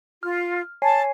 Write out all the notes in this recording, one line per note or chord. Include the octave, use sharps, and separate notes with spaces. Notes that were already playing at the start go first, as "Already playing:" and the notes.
F4 F6
C#5 G#5 A5 C7